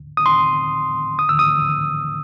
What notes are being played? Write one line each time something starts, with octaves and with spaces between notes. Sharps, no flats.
D#6
C6
D#6
E6
D#6